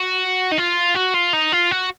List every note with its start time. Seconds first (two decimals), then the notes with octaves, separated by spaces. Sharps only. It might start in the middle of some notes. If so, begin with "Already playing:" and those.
Already playing: F#4
0.52 D#4
0.58 F4
0.95 F#4
1.14 F4
1.33 D#4
1.52 F4
1.71 F#4